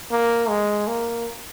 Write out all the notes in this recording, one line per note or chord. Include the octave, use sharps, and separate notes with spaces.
A#3
G#3
A#3